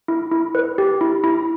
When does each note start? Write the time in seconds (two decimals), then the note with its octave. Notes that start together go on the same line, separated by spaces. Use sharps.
0.08 E4
0.32 E4
0.55 B4
0.78 G4
1.01 E4
1.24 E4